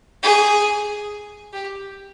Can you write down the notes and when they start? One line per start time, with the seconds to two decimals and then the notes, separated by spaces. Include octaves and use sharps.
0.23 G#4
1.53 G4